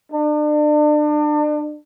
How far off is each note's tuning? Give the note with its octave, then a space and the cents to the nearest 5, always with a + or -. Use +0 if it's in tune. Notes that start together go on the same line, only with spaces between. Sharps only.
D4 +35